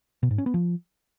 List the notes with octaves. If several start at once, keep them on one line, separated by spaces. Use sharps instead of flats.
B2
G#2
C#4
B3
F3